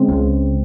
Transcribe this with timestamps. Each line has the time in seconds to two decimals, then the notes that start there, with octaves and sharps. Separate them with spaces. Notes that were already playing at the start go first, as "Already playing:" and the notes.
Already playing: C#3 G#3 C4
0.09 C#2